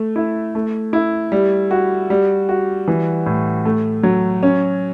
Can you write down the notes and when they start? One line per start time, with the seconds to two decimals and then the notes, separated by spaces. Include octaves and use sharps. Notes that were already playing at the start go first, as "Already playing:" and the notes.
Already playing: A3
0.16 E4
0.55 A3
0.93 E4
1.32 G3
1.71 F#4
2.10 G3
2.49 F#4
2.88 E3
3.26 A2
3.65 A3
4.03 F#3
4.43 C#4